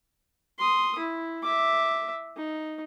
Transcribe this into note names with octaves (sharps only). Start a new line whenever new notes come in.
C6 D#6
E4
E5 D6
D#4